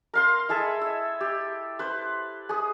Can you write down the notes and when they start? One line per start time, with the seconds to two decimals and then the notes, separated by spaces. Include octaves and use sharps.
0.14 A#4 F5 C6
0.49 E4 G#4 A4 E5
0.81 E5
1.20 G4
1.79 B4 C5
2.49 G#4 D#6